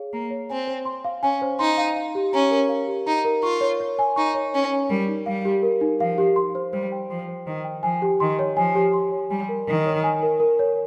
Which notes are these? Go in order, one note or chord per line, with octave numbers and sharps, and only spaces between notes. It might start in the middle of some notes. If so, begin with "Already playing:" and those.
Already playing: G#4 C#5 F5
A#3 A#5
C#5
C4 G#5
C5
C6
F5
C#4 G#5
C5
D#4 C6
F5
F5
G4
C#4 A#5
A#4
F5
G4
D#4 A#5
A#4
F4 C#6
C#5
C#5
G#5
D#4 C#6
C#5
C#4 C#5
G#5
G3 A#4
D#4
G3 F5
G4
A#4
D#4
F3 F5
G4
C6
C5
G3 C5
G5
F3 C6
C5
D#3 C5
G5
F3 G#5
G4
D#3 C6
C#5
F3 G#5
G4
C6
C#5
G3 G#5
A#4
D#3 A#4
C#5
G#5
A#4
A#4
C#5